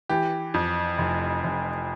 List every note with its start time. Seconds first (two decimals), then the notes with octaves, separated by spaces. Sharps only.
0.09 E3 G4
0.54 F2
0.98 F1
1.44 F1